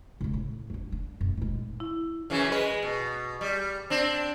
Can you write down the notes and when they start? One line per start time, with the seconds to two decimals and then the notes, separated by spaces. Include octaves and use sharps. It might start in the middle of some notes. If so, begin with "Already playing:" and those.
0.21 C#3 G#3
0.34 A2
0.70 F#3 D4
0.92 D4
1.21 F#2 A2
1.37 D#1 G#3
1.80 E4
2.30 F#2 C#3 E3
2.50 G#3 B4
2.82 B2
3.41 G3
3.90 C4 D4